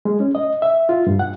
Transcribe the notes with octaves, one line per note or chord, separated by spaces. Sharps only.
G#3
C#4
D#5
E5
F4
G2
F#5